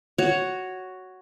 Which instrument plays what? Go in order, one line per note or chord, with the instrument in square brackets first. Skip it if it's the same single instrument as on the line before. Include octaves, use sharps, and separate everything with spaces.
[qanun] F#4 C#5